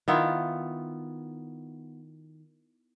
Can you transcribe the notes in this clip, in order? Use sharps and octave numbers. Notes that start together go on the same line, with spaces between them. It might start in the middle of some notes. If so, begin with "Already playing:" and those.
D#3 B3 E4 F4